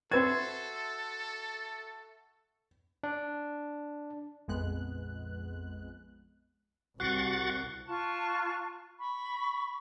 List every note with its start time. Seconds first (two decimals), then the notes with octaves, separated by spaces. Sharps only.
0.12 C4 F#4 A4 B4 E5 C6 G#6 A6
3.03 D4
4.48 A#1 F2 G#3 B3 F#6
7.00 C2 F#4 F#5 F#6 A6 C7
7.87 F4 A5 C#6 F#6
9.00 B5 C#6